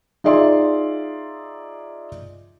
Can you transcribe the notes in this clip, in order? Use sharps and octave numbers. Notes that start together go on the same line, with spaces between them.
D#4 F4 G#4 D5 E5 C6